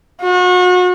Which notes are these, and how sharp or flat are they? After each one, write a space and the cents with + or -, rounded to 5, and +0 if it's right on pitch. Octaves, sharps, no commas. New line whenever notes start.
F#4 -35